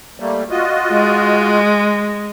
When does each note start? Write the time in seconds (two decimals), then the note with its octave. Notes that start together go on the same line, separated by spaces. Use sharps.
0.20 G3 A3 A#3
0.50 F4 F#4 D#5
0.90 G#3